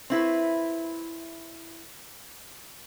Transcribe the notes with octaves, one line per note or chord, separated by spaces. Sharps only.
C4 E4 B4